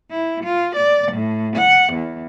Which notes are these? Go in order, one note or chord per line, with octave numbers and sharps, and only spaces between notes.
E4
F4
D5
A2
F#5
E2